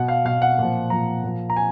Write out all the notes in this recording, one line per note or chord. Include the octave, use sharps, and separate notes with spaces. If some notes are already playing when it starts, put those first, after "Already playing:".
Already playing: B2 F#5
F5
B2 F5
F#5
A#2 F3
A#2 F3 A#5
A#2 F3
A#5
G#5